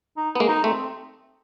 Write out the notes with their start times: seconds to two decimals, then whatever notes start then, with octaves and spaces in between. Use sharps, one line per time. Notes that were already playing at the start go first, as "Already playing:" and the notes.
0.17 D#4
0.35 B3
0.40 G#3 A#3
0.48 D#4
0.64 A3 C4